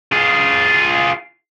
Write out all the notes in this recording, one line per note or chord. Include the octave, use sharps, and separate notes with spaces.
F4 G#4